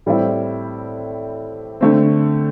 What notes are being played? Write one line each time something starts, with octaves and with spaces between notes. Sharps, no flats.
A2 G3 C4 E4
D3 A3 C4